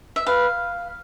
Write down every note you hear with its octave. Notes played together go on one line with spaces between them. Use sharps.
E5
B4 F5